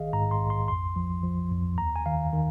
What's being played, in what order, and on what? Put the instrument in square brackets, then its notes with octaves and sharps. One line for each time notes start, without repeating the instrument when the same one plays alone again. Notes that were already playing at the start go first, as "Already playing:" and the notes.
Already playing: [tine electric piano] A#1 D#3 G#4 D#5 F5
G#2 A#5
C6
A#1
C6
F2 C6
F3
F3
F2
D#2 A#5
G#5
D#3 F5
D#3